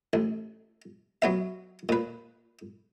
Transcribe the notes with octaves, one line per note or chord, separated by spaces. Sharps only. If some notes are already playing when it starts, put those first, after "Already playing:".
A1
F#3 B3 E5
A#2 B4